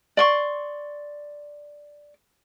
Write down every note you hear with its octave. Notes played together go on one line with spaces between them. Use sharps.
D5 C6 C#6